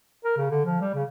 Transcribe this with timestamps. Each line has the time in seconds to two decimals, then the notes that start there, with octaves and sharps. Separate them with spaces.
0.25 A#4
0.37 C#3
0.50 D3
0.65 F3
0.81 G3
0.94 C#3